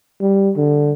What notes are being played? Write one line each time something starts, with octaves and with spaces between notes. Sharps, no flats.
G3
D3